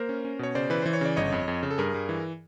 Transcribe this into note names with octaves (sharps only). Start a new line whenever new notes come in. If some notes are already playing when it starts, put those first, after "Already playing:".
Already playing: A#3 A#4 C5
C#4
C#4
B2 C#5
C#3 C5 D5
E3 B4
E3 C5
C#5
C#3 D5
G1 C#5 D#5
F2
F2
C#3
A4
G2 G#4 A#4
G2
E3